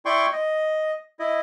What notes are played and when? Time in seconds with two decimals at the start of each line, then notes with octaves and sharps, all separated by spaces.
0.05 E4 D5 G5 C6 C#6
0.32 D#5
1.20 E4 D#5